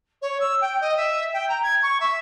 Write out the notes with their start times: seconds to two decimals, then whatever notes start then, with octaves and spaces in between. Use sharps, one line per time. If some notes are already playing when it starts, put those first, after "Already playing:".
0.21 C#5
0.40 E6
0.61 G5
0.80 D#5
0.97 E5
1.33 G5
1.48 A#5
1.62 G#6
1.82 C#6
2.00 E5